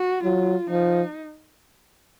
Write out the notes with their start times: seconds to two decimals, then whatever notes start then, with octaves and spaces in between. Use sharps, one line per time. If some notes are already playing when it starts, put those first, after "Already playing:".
Already playing: F#4
0.24 F#3 F4
0.69 F3 D#4